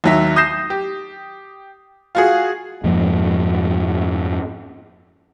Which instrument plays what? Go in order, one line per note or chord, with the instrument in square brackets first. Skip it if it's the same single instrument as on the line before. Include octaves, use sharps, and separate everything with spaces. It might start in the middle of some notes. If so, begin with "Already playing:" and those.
[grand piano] D#2 F#3 E5
D#6 G6 A#6 C7 E7
G4
F4 F#4 G#4
[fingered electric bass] F2 G#2 F3 A#3